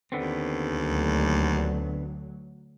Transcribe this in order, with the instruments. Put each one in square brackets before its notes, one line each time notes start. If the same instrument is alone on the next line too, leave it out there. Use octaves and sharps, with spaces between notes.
[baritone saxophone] D#2 [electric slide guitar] D3 B3 C4
[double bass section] D2 F#3